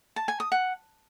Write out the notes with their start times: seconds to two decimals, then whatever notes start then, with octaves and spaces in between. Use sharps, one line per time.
0.16 A5
0.28 G#5
0.40 D#6
0.52 F#5